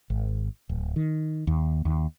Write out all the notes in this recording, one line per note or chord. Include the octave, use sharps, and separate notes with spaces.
G#1
D1
D#3
D#2
D#2